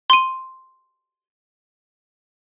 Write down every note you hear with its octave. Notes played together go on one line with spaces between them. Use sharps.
C6 D#7